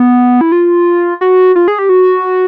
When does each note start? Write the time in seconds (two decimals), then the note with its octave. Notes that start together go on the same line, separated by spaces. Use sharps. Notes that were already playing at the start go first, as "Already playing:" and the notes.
Already playing: B3
0.41 E4
0.52 F4
1.21 F#4
1.56 F4
1.68 G#4
1.79 G4
1.89 F#4